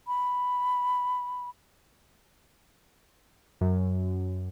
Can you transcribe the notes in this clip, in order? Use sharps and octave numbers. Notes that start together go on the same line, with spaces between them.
B5
F#2